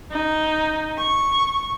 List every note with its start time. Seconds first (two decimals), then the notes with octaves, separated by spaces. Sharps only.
0.12 D#4
0.98 C#6